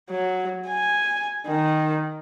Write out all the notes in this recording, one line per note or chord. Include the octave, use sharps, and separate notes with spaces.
F#3
G#5
D#3